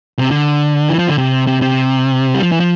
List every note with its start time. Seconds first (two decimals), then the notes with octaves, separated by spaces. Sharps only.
0.19 C3
0.31 D3
0.89 E3
0.99 F3
1.08 D3
1.18 C3
1.47 C3
1.62 C3
2.35 G3
2.43 F3
2.52 E3
2.60 F3